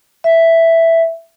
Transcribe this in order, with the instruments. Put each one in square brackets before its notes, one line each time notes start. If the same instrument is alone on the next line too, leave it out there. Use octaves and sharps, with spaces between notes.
[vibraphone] E5